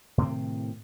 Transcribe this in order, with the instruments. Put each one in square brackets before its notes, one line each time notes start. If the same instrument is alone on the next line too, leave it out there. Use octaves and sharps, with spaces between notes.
[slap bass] A2 C3 D#3 C4